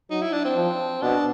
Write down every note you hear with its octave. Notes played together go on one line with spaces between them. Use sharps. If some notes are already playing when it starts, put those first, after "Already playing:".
F#3 D#4
E4
D4
C4
F3
B2 D4